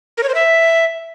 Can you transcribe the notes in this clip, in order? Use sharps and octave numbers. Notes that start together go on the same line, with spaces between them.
A#4
C#5
C5
E5